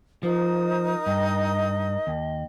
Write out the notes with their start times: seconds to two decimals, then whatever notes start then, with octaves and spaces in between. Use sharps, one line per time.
0.23 F3 D#4 A#4 C5 D#6
1.06 G2 D#5
2.07 D#2